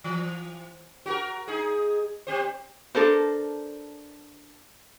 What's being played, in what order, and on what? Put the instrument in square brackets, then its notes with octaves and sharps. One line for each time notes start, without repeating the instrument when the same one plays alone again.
[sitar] E3
F#4 G4 A#4
D#4 G#4
C4 G4 C5
[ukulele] D4 A4 A#4 C5